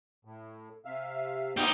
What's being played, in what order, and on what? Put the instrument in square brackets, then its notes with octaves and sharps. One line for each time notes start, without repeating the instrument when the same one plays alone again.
[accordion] A2
C3 E5 F5
[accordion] A3 B3 C4 [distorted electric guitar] D#4 G4